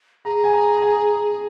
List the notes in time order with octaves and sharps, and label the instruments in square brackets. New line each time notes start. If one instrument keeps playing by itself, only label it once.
[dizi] G#4 [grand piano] A#5
[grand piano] G#5
A#5
A#5
G#5